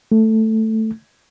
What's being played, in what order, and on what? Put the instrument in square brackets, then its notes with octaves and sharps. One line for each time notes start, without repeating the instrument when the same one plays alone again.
[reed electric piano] A3